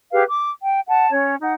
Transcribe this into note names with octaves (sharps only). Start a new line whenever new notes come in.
G4 G#4 B4 F5
D6
G5
F#5 A5
C#4 C#5
D#4 F#5